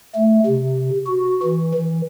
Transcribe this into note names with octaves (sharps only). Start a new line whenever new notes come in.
A3
C3
F#4
E3
E3